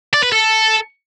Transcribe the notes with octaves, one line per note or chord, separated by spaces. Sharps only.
D5
B4
A4